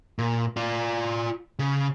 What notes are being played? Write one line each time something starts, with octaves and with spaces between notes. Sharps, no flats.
A#2
F4 D5
C#3